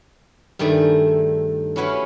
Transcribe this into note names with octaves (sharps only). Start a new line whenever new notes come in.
G2 D#3 A3 G#4 D5 E5
C#4 E4 F#4 B4 C#5 F5